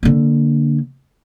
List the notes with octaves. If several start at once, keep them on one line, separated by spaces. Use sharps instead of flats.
D3 A#3